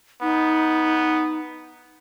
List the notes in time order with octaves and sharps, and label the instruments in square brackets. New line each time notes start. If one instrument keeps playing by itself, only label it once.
[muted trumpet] B3 [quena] D#4